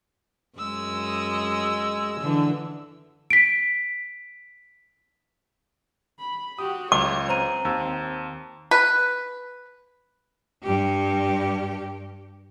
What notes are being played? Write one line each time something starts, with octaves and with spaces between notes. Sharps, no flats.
F#2 G#3 D#5 E6
D3 E3
B6 D7
B5
F#4 G4 D#6
C#2 C#5 D6
C4 C5 A#5 D#7
D#2 E6
B4
G2 G4